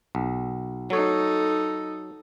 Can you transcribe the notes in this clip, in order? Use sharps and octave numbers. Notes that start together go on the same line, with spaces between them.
B1
F#3 D#4 A4 C#5